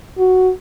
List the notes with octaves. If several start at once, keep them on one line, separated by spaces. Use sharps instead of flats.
F#4